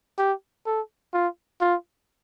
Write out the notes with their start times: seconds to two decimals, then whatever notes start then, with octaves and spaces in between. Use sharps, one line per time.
0.18 G4
0.66 A4
1.14 F4
1.61 F4